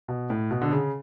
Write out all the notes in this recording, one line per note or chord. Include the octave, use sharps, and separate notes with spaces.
B2
A2
B2
D3
C#3